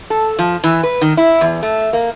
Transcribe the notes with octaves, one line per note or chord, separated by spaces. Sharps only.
A4
F3
E3
B4
D#3
E4
E2
A3
A#3